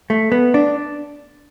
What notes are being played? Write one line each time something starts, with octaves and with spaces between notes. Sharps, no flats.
A3
B3
D4